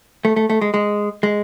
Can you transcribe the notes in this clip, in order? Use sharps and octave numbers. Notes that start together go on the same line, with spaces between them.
A3
A3
A3
G#3
G#3
G#3